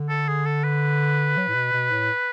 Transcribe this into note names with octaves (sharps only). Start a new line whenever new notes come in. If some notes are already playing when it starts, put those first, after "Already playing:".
Already playing: D3
A4
G#4
A4
B4
F#3
A2
B2
B2
A2